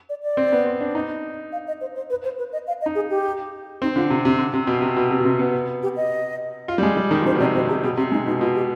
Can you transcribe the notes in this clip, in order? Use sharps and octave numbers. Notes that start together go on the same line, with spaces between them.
D5
D5
C4
B3
C4
D4
D#4
F5
D#5
C5
C5
B4
C5
B4
D#5
F5
D#5
D#4
G#4
G4
C4 D#4
D3 F4
C3
C3
D3
C3
B2
C3
B2
C3
B2
C3
B3
G4
D#5
F4
G3
G#3
G3
D#3
F3
D#3 C5
B2
C3 D5
B2 C5
C3 G#4
B2 G#4
C3 G4
G#3 D#4
B2 D#4
B2 F4
G4